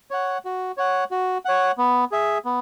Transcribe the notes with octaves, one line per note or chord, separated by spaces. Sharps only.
C#5 F#5
F#4
C#5 F#5
F#4
C#5 F#5
B3
G#4 E5
B3